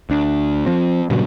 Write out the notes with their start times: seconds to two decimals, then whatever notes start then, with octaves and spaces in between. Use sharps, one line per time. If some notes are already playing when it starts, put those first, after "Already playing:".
0.10 D2 D4
0.66 F3 C4
1.10 G2 A#2 C#3 F#3